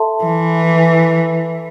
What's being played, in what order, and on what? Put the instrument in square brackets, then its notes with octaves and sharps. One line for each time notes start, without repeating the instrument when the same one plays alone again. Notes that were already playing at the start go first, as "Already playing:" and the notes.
Already playing: [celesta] A4 E5 A5 C6
[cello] E3